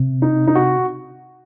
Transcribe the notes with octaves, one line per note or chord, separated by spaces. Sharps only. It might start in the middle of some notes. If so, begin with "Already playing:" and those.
Already playing: C3
D#4
D#4
F#4